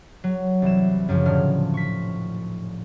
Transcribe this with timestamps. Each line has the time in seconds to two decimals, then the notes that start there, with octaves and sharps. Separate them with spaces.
0.24 F#3
0.62 C2 E3 E7
1.09 F#2 C#3 F3
1.26 D#1 A2 D3 F6
1.74 C#6 B6